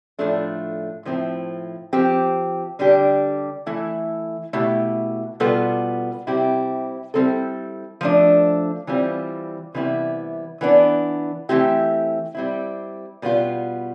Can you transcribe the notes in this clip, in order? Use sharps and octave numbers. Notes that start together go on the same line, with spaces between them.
A2 F3 A3 D4
A2 F3 C4 E4
F3 C4 G4
D3 G3 D4 G4
E3 A3 E4
B2 A3 E4 G4
B2 G3 B3 F4 A4
C3 G3 C4 E4 G4
G3 C4 E4 A4
F3 A3 D4
E3 G3 C4 F4
C3 E3 G3 B3 E4
E3 B3 D4
E3 A3 C4 E4 G4
G3 C4 E4
B2 G3 B3 F4